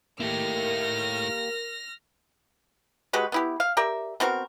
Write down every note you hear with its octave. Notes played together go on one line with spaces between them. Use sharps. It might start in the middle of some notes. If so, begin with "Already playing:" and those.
A3 A#3 E4 G4 A#4 F6 A#6
G#3 F#4 G4 B4
B3 E4 G4
F5
G4 A#4 D5 E5
B3 C4 F#4 A#4